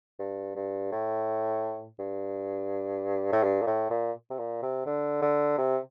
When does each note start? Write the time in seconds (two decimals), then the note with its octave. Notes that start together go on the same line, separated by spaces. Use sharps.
0.19 G2
0.55 G2
0.92 A2
1.99 G2
3.32 A2
3.43 G2
3.62 A#2
3.67 A2
3.90 A#2
4.30 C3
4.38 A#2
4.62 C3
4.86 D3
5.22 D3
5.58 C3